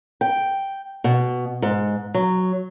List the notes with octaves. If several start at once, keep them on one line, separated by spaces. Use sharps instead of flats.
G5
B2
G#2
F#3